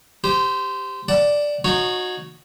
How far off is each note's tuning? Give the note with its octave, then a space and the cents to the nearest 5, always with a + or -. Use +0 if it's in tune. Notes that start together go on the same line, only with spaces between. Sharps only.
G4 +0 C5 -20
D5 +0 F#5 +30 A5 +0
D#4 -20 F#4 -20 C#5 +0